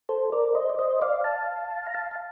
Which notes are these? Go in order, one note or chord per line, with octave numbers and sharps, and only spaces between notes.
A4 C5
A#4 D5
C5 D#5
D5
C5 D#5
D5 F5
F5 A5
A#5
F5 A5
A5